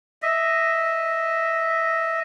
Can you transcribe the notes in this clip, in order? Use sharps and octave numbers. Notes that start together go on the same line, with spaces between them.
D#5 E5